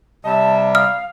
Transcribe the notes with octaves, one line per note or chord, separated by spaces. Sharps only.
C3 G3 E5 A5
F5 D#6 F6